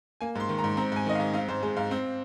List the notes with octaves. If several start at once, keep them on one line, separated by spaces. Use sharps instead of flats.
A#3 G#5
G#2 C6
D#3
A#5
G#2
C4 A#5
G#2 G#5
D#3 D#5
F5
G#2
C4 F5
G#2 C5
G#3 C5
G#2 F5
C4